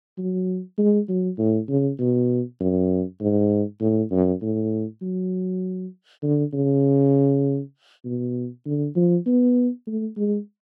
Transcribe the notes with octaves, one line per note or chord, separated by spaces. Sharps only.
F#3
G#3
F#3
A2
C#3
B2
F#2
G#2
A2
F#2
A2
F#3
D3
C#3
B2
D3
F3
B3
A3
G#3